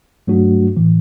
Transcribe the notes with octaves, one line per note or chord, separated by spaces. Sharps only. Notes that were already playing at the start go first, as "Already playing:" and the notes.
G2 F#3 A3 D4 F#4
A2 E3